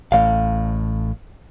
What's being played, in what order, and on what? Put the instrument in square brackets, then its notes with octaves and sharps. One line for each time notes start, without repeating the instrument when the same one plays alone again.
[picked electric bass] A1 A2 [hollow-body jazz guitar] F5